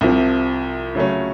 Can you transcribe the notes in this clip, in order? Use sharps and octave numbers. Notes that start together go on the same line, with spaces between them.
C2 C3 F3
C#3 F#3 A3 C#4